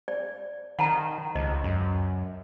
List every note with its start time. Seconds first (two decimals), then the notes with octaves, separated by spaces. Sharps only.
0.08 D5
0.79 D#3 F#5 A5 A#5
1.35 C#2 D#5
1.64 F#2